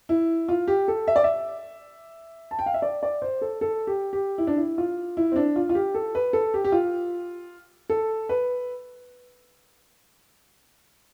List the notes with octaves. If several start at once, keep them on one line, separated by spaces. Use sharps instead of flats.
E4
F4
G4
A4
E5
D5
E5
A5
G5
F5
E5
D5
D5
C5
A4
A4
G4
G4
E4
D4
E4
F4
E4
C4
D4
F4
F4
G4
A4
B4
A4
G4
G4
F4
A4
B4